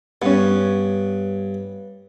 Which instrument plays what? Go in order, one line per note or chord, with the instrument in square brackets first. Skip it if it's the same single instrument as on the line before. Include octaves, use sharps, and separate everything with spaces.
[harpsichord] G2 [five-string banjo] B3 C#4